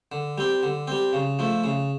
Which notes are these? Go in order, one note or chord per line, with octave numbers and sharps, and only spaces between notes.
D3
G3 C4
D3
G3 C4
C#3
F3 A3
C#3